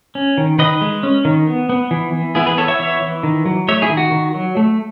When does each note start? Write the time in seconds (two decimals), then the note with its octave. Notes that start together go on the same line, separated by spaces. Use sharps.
0.15 C#4
0.38 D#3
0.59 D#3 B4 D#5
0.81 G#3
1.03 C#4
1.25 D#3
1.47 B3
1.69 B3
1.91 E3
2.13 E3
2.35 B3 E4 G#4
2.46 G#4 B4
2.58 B3 A4 C#5
2.68 C#5 E5
2.80 E3 C#5 E5
3.02 E3
3.23 D#3
3.46 F#3
3.68 A3 C#5 E5
3.82 E4 G#4
3.89 D#3
3.97 F#4
4.12 D#3
4.34 F#3
4.57 A3